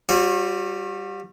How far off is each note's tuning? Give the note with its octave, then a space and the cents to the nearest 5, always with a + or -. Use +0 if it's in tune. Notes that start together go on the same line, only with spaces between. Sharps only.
G3 +0 F#4 -40 C#5 -45